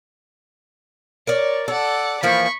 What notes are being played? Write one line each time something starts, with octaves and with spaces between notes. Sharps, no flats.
A#4 C#5 D5
A4 D5 F#5
E3 F3 A#3 B5 C#6